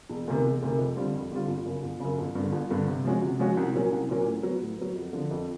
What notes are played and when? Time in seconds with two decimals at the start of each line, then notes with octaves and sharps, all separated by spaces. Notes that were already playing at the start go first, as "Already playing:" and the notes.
0.09 E1
0.27 D2 C3 D#3
0.45 E1
0.62 D2 C3 D#3
0.79 F2
0.97 D3 G3 C4 F4
1.14 F2
1.31 D3 G3 C4 F4
1.48 G1
1.65 F#2 C#3
1.83 G1
2.00 F#2 C#3
2.18 G1
2.35 G2 D3
2.52 G1
2.71 G2 D3
2.88 C3
3.04 F3 G#3 C#4 F#4
3.22 C3
3.39 F3 G#3 C#4 F#4
3.57 C2
3.74 A#2 F#3 A#3 C#4
3.92 C2
4.09 A#2 F#3 A#3 C#4
4.26 A2
4.43 F#3 B3
4.62 A2
4.78 F#3 B3
4.96 F2
5.13 D3 F3
5.31 F2